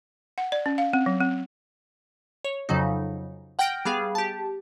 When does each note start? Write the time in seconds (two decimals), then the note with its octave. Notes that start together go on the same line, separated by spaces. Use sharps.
0.38 F#5
0.52 D5
0.66 C#4
0.78 F5
0.93 C4
1.06 F#3
1.21 C4
2.45 C#5
2.69 F2 C#3 F#3 D#4
3.59 F#5 G5 F6 G6 A#6 D7
3.85 G3 B3 G#4 F5
4.15 G4 A5